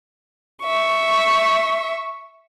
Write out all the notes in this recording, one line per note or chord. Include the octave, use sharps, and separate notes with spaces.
E5 C#6